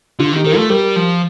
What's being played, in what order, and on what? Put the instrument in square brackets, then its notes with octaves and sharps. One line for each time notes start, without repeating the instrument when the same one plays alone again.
[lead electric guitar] D3 [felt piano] D4 F4
[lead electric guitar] D#3
[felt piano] D#4 G4
[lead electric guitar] D#3 [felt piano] A#4
[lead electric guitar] A3 [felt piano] F4 A4
[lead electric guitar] G3 [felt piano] G4 A#4
[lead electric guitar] F3